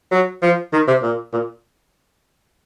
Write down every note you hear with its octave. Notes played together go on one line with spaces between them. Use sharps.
F#3
F3
D#3
C3
A#2
A#2